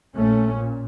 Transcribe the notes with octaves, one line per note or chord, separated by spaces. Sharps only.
A#1 A3 C#4
A#2